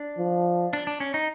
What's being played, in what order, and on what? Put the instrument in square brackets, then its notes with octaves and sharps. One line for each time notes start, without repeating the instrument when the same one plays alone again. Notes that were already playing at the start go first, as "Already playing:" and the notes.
Already playing: [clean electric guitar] D4
[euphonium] F3
[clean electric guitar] D4
D4
C#4
D#4